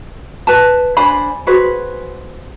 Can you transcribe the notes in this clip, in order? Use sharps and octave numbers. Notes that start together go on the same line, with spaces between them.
B4 A5
D4 C5 G#5 B5
F#4 G#4 B4 C5